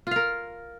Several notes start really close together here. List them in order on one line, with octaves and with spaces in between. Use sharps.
F4 F5 A#4